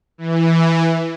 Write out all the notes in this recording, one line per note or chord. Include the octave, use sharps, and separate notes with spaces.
E3